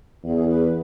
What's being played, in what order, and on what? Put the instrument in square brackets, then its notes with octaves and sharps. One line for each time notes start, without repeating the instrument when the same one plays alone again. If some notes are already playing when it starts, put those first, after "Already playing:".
[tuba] E2 [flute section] G#4
[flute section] B4